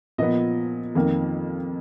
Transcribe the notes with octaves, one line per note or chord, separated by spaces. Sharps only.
A#2 F3 B3 D#5
F2 D#3 A#3